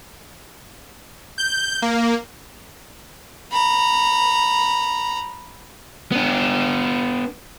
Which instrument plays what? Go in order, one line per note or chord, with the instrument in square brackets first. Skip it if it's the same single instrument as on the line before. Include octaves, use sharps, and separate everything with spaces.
[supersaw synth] G6
A#3
[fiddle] A#5 B5
[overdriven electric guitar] B3 D4